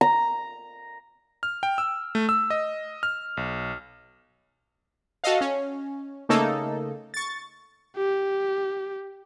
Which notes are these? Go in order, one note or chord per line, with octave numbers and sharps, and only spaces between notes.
A#5
F6
G5
E6
A3
E6
D#5
F6
B1
F#4 A4 D#5 F5
C#4
C#3 A3 A#3 D#4 A4
C#6 A6
G4